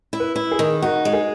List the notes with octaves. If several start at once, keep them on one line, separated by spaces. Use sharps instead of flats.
E4
B4
E4
G#4
D#3
D#4 F#4
G#3
G#4